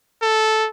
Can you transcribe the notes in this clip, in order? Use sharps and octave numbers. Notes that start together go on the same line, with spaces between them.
A4